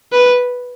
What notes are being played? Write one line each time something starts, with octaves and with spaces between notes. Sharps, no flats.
B4